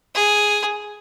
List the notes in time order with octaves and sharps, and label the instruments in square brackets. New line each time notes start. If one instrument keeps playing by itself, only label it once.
[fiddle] G#4